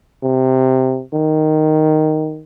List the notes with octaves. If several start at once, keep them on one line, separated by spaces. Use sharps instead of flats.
C3
D#3